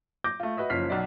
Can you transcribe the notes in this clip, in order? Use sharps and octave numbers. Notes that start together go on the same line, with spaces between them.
D6 G6 A#6
A3 F4
F#4 B4 D#5 E5
F#1 F3 C#4 F6 B6 C7
B1 F#3 D5